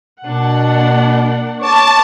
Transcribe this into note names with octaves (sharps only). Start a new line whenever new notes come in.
B2 A#3 D4 F#5
C#5 A5 D6